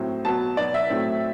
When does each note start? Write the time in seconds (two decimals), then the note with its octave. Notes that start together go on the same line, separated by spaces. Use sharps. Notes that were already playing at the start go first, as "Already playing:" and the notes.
Already playing: A2 F#3 C4
0.24 B2 F#3 B3 A5
0.57 B2 F#3 B3 D5
0.74 E5
0.90 A2 F#3 A3 C4